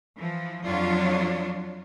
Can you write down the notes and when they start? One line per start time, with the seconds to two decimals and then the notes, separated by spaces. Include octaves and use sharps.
0.17 E3 F3
0.65 F2 F#3 D4 F4 C#5